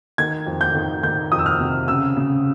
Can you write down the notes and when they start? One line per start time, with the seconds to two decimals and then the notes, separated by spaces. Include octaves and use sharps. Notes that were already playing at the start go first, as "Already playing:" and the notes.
0.18 D#3 G#6
0.46 F2
0.61 G6
0.75 D#3
1.03 D#3 G6
1.32 F2 D#6
1.39 E6
1.46 F6
1.60 C3
1.88 C#3 E6
2.16 C#3